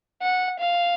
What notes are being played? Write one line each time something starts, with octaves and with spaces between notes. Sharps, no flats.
F#5
F5